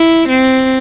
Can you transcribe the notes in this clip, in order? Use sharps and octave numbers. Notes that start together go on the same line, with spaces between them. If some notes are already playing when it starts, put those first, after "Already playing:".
Already playing: E4
C4